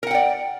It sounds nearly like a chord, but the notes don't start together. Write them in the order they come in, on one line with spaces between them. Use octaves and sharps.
A#4 F#5 G5 D5